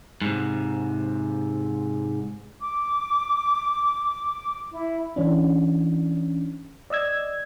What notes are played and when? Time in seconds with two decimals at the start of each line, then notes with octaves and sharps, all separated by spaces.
0.21 G#2 C3
2.61 D6
4.72 E4
5.16 E3 C#4 D4
6.90 D5 D#5 E6 G#6